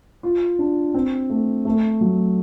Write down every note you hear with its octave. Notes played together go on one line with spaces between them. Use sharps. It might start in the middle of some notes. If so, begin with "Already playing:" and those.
F4
D4
C4
A3
A3
F#3